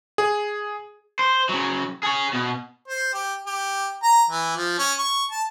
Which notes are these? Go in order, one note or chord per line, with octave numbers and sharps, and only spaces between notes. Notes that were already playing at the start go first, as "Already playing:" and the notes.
G#4
C5
C#3 F#3
G#4 C#5
B2
C5
G4
G4
A#5
E3
F3
C#4
C#6
A5